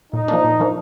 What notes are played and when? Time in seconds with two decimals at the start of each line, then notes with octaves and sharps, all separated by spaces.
0.13 A#2 D#4
0.28 F3 A#3 D4
0.44 A#2
0.60 F3 A#3 D4